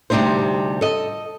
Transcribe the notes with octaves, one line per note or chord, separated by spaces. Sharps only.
D2 C3 G3 D4 D#4 C5
A4 D#5